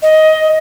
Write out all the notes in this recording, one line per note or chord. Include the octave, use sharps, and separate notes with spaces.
D#5